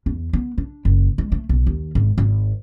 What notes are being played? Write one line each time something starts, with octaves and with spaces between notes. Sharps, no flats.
E2
B3
D4
F#1
G#3
A3
B1
D#2
G#1
G#1